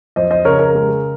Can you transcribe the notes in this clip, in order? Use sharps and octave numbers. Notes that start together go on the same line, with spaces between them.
F2 C5 D#5
C5 D#5
C#3 A#4 C#5
A#4
G#3